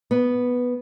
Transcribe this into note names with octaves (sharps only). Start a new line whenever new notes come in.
B3